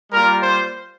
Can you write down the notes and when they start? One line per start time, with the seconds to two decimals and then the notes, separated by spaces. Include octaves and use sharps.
0.11 G3 A#3 F4 A#4
0.41 C5